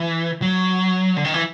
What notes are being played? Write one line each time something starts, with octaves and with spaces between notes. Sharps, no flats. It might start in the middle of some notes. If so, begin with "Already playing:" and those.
Already playing: E3
F#3
D3
D#3
E3